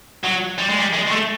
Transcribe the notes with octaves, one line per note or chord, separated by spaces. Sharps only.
F#3
G3
G#3
G3
G#3
G#3
A3